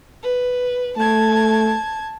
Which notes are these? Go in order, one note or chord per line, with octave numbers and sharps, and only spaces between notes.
B4
A3 A5 G#6